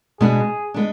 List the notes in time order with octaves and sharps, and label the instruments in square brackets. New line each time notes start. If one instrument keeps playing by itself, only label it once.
[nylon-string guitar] B2 G#3 B3 D4 [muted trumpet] G#4
[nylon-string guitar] G#3 B3 D4